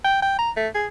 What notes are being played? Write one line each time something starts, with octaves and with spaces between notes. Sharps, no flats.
G5
G5
A#5
A3
G#4